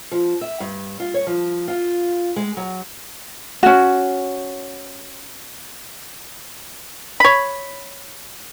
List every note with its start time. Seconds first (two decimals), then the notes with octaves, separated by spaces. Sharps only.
0.11 F3
0.41 E5
0.60 G2
1.00 F4
1.14 C#5
1.27 F3
1.68 F4
2.36 G#3
2.57 F#3
3.63 C#4 F#4
7.20 C#5 B5